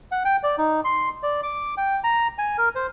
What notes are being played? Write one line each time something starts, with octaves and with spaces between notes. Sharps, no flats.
F#5
G5
D5
D#4
C6
D5
D6
G5
A#5
G#5
A#4
C5